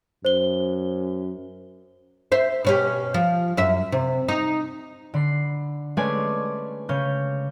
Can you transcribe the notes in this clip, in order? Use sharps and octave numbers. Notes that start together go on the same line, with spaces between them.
F#2 C5 G7
C5 E5
B2 C#4 G4
F3
F#2 E5
C3
D#4
D3 B5 C7
G#3 A3 C#4 B4 D5 G#5
C#3 C#4 G6